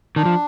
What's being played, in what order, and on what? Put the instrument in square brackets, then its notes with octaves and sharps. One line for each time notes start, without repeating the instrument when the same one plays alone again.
[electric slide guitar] D#3 [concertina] D4
[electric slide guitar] F3